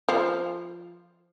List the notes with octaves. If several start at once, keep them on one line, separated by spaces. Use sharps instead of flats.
F3